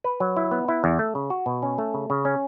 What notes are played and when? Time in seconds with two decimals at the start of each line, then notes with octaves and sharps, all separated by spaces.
0.04 B4
0.20 F#3
0.36 E4
0.51 B3
0.68 E4
0.84 E2
0.99 A3
1.15 C#3
1.30 F#4
1.46 B2
1.63 C#4
1.78 A3
1.94 C#3
2.10 C#3
2.25 C#4